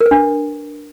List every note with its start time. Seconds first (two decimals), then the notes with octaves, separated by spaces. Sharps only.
0.01 A#4
0.06 B4
0.11 D4